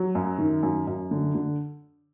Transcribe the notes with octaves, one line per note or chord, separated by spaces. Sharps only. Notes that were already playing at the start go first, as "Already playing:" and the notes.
Already playing: F#3
F#2
D#3
F#2
F#2
D3
D3